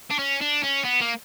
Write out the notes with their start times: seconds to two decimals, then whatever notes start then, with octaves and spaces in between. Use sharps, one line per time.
0.11 D4
0.19 C#4
0.41 D4
0.63 C#4
0.84 B3
1.01 A#3